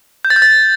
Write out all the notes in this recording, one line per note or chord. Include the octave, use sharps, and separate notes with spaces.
G6
A6
G6
A6